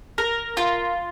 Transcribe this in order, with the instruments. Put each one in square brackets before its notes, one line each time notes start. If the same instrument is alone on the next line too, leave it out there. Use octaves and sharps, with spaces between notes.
[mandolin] A#4
F4